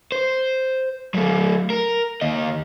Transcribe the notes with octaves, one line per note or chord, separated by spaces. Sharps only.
C5
F#3 A3
A#4
D#2 D#5